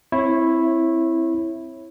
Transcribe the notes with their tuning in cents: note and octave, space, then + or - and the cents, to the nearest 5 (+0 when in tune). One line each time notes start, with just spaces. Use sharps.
C4 +0 E4 +0 C#5 -25